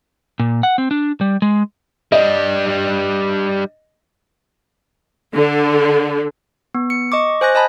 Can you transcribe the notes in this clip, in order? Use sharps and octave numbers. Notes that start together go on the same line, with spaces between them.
A#2
F#5
C4
D4
G3
G#3
G3 D4 D#5
D3
B3
C#7
D#5 C#6 D6
C5 G#5 F#6 A#6
D#5 G#5 A5 B5